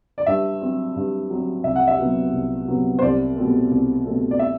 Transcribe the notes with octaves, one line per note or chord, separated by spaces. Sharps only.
D5
G2 E5
F#3 C4
G2
F#3 C4
C2 E5
F#5
E5
C3 F#3 B3
C2
C3 F#3 B3
C5
C2 D5
B2 A3 C4
C2
B2 A3 C4
D5
E5